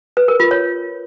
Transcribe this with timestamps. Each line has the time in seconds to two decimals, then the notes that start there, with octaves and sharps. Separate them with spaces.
0.17 B4
0.28 A#4
0.40 F4
0.51 C#5